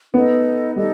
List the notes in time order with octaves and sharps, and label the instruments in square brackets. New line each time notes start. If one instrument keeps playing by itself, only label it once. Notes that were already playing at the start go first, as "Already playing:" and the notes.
[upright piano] B3 [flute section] D#4 A4 D#5
[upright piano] G3 [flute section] D#4 A4 D#5